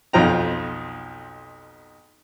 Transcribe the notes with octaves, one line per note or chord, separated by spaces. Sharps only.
B1 F2 F4 C5 G5 A#5